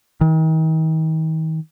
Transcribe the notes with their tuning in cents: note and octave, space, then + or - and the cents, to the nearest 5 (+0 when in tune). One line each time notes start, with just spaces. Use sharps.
D#3 +40